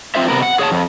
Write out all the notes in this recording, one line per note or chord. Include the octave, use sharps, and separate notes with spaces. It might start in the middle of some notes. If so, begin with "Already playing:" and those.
C4 F4 C5 E5
C3 B3 A#4
F#5
G#4 C#5 F5 A5
F2